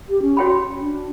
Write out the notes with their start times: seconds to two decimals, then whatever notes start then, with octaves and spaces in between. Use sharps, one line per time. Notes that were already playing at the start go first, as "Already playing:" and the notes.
0.09 G4
0.22 C#4
0.37 F#4 C#5 G5 B5
0.81 D4